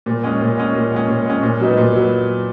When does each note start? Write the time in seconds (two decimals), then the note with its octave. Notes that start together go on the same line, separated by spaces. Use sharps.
0.06 A#2
0.23 G#3 C#4
0.41 A#2
0.58 G#3 C#4
0.75 A#2
0.92 G#3 C#4
1.08 A#2
1.26 G#3 C#4
1.43 A#2
1.60 F#3 B3 D#4
1.77 A#2
1.94 F#3 B3